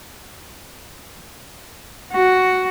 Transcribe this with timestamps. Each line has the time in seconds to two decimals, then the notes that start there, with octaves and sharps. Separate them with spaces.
2.13 F#4